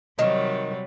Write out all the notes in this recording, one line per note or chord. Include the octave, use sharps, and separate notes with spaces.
C3 D#3 F#3 G3